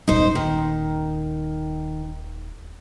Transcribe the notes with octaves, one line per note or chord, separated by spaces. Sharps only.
D#1 C#4 D#4 C5
D#3